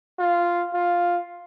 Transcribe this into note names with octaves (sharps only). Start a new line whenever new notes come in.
F4
F4